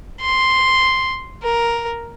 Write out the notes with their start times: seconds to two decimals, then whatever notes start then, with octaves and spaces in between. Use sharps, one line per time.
0.21 C6
1.43 A#4